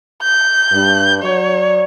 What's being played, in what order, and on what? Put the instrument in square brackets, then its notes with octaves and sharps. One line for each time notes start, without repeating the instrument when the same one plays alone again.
[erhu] G6
[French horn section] G2
[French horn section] F#3 D5 [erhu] C#5